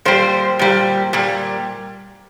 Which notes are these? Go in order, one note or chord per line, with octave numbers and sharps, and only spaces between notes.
A#2 G3 C5
A#2 G3
A#2 G3